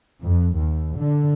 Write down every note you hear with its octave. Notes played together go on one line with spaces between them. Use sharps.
F2
D#2
D3